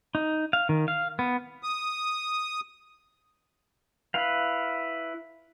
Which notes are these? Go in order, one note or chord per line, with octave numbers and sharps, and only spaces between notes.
D#4
F5
D#3
F5
B3
D#6
E4 B4 F5